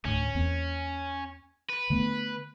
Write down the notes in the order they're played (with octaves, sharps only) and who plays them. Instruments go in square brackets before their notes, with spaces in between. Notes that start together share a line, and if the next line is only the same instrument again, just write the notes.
[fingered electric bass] D2 A2 [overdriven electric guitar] C#4
[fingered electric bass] E2 A#3 C4
[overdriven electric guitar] B4
[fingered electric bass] D3 A3 B3